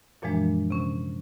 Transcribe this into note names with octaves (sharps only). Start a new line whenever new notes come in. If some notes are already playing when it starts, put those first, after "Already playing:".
F#2 A#2 E3 F3 G#3 D4
C3 C#4